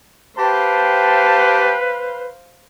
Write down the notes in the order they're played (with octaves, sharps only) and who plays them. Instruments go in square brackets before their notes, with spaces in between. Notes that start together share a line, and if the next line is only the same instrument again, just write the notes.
[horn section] G4 G5 A5 [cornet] B4 [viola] C5 F5